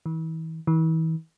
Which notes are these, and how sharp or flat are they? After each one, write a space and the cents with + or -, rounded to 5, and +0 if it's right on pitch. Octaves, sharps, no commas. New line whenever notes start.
E3 -40
E3 -40